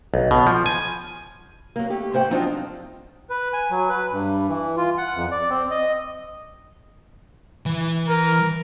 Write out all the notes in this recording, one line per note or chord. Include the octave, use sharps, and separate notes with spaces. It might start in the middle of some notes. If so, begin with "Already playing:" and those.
B1
B2
F3
G#5
F#3 A#3
A3 G4
G#2 A3 A#3 C5 F#5 G5
F3 F#3 C4 D4 D#4 F4
B4
G#5
F#3
B4
G2
E3
F4
F#5
F2
D5
C4
D#5
E3 B4
A#4